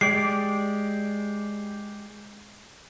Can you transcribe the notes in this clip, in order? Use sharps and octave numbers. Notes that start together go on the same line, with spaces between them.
G#3 G4 D5 C7